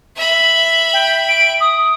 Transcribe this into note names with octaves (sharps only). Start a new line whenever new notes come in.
E5 B5
G5
D7
D#6